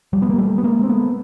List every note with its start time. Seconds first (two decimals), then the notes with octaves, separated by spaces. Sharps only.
0.13 F3 G3
0.22 B3
0.30 A#3
0.38 G3 A3
0.58 B3
0.63 G#3 A#3
0.83 C4
0.89 A3 B3